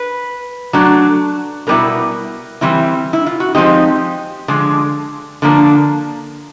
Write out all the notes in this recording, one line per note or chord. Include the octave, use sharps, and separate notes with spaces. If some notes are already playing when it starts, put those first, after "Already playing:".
Already playing: B4
F#3 A3 D4
B2 G3 B3 E4 A#4
E3 G3 C4 E4
E4
F4
F#4
F3 G#3 C4 D#4 G4
D3 F3 G#3
D3 F3 A#3 D4